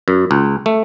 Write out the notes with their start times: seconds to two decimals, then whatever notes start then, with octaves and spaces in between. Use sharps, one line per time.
0.08 F#2
0.31 C#2
0.66 A3